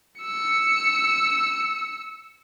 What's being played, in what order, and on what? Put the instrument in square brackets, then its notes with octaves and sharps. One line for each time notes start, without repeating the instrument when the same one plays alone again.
[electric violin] E6 C#7